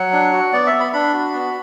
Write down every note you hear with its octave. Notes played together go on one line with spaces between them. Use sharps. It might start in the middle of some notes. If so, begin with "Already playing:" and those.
Already playing: F#3 F#5
D4
F#4
B3 D5
E5
B3
B5
D4 B5
F#4
B3